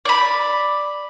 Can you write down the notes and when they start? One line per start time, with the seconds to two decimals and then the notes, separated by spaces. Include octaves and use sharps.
0.05 D5 B5